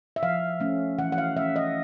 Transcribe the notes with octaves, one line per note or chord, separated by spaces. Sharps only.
E5
F3 F5
A3 C#4
E3 F#5
F#5
F5
A3 C#4 E5
D#5